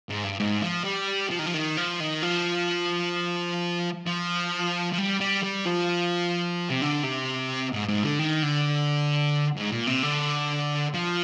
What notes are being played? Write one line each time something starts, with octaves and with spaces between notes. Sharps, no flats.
G#2
G2
G#2
F3
G3
F3
D#3
F3
D#3
F3
D#3
F3
F3
F3
G3
G3
G3
F3
C3
D3
C3
G#2
G#2
D3
D#3
D3
G#2
A#2
C3
D3
F3